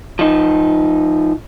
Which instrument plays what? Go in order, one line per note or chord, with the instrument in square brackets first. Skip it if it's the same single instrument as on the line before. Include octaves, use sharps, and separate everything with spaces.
[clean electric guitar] F3 D#4